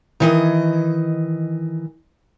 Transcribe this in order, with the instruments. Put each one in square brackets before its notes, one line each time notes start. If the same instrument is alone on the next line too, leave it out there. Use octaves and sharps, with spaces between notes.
[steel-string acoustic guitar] D#3 E3 D#5